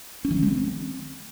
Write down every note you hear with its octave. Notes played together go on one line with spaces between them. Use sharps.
C#4
E3
D3
G#3
C4